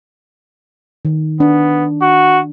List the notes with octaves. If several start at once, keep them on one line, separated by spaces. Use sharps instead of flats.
D#3
B3 D4
F#4